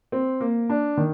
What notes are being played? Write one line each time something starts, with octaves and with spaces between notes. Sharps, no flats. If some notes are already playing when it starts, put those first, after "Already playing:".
C4
A#3
D4
D#3